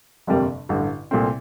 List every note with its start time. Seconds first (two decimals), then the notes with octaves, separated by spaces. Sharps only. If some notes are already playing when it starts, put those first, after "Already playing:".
0.27 G1 F2 C3 G3 A#3
0.69 A1 G2 D3
1.11 C2 A#2 A3 C4